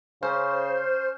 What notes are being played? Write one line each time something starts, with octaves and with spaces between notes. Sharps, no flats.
C#3 C#4 C5